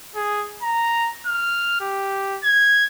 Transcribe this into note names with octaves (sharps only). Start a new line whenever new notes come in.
G#4
A#5
F6
G4
G#6